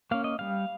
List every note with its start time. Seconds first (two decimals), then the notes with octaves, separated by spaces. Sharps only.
0.11 A#3 C#4 F5
0.24 D#5
0.39 G3 F5